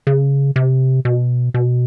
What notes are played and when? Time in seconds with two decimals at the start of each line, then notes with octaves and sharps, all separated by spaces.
0.07 C#3
0.56 C3
1.05 B2
1.54 B2